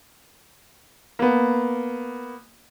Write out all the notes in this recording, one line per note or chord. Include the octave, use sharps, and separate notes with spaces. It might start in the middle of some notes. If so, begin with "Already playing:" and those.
A#3 B3